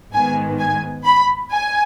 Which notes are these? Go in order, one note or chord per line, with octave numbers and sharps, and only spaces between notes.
G#2 D#3 B3 G#5
G#5
B5
G#5